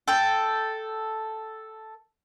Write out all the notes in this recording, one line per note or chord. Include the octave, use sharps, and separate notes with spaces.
A4 G5